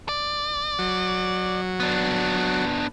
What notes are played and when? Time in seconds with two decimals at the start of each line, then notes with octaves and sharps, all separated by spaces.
0.09 D5
0.79 F#3
1.80 B3 D4